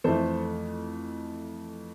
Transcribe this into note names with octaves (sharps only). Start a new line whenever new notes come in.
F2 E3 A3 A4 C5